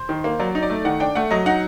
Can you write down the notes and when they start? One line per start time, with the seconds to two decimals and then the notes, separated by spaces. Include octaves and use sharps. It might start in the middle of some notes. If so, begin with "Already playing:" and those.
Already playing: C5
0.09 D#3
0.24 A#3
0.39 F#3 D5
0.55 D#4
0.63 D5
0.70 A3
0.85 D#3 F#5
1.00 D4 G5
1.15 A3 F#5
1.31 F#3 D#5
1.46 D#4 F#5